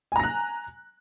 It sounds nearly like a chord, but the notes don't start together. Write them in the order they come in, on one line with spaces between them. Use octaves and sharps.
G#5 A#5 A#6 F#6